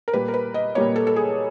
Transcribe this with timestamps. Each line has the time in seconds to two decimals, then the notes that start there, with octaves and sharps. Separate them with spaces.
0.08 A#4
0.13 A#2 G3 A#3 B4
0.28 A#4
0.34 B4
0.54 D#5
0.75 A#2 G3 A#3 C#5
0.96 A4
1.07 A4
1.16 G#4